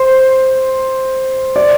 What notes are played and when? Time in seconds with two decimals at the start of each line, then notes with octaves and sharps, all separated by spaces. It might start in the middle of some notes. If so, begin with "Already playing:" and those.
Already playing: C5
1.56 D5